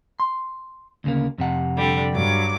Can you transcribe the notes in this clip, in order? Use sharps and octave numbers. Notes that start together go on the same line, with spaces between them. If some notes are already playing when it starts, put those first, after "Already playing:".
C6
D2 C#3 A#3
F2 C3 F#5
D3 G3
G2 F#3 D6